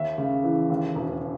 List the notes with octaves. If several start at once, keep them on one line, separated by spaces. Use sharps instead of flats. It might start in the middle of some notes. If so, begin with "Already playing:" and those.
Already playing: D#2 E5
C#3
E3
D#2
E1